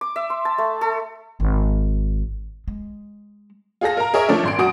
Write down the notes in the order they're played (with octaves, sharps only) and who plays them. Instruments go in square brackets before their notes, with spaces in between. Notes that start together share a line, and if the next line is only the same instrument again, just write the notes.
[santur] D6
E5
C6
A5
A3
A4
[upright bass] G#1
G#3
[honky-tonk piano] F4 G#4 A4 A#6
A#4 F5 A#5
G#4 A#4 C#5 D#5 E5
F3 A3 C#4 D4 A4 E5
G#1 C6 D7
F#2 F#4 D#6 D7